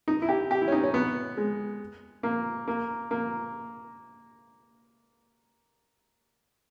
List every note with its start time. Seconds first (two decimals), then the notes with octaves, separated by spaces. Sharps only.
0.08 D#4
0.22 E4
0.29 G4
0.51 G4
0.62 E4
0.68 C#4
0.72 D#4
0.84 C#4
0.94 B3
1.37 G#3
2.23 A#3
2.68 A#3
3.11 A#3